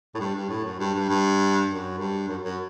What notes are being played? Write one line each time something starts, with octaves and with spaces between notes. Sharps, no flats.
A2
G2
G2
A2
F#2
G2
G2
G2
F#2
G2
F#2
F#2